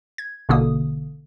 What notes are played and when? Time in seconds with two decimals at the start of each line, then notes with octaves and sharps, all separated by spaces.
0.18 G#6
0.49 A1 B2 D3 A#3 D#6